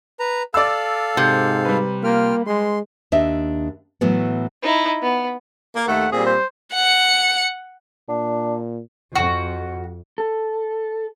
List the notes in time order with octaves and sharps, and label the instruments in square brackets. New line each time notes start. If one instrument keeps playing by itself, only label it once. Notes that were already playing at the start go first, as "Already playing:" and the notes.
[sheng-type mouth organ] B4 A#5
[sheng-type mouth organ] A4 F5 [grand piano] D5 E6
[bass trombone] G#2 [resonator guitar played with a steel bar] C3
[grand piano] G3 B4
[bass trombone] A#3 [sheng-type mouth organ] F4 G5 F6
[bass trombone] G#3 [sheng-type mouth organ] C6
[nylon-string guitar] D#2 D4 D#5 E5
A2 E3 F#3 A3 B3
[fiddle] D#4 E4
B3
[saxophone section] A#3
[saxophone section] D#2 A3 [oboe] F#5
[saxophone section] A#2 G3 C4 [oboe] G#4
[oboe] C5
[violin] F#5 C#7
[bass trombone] A#2 [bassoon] D4
[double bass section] F2 [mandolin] F#4
[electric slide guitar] A4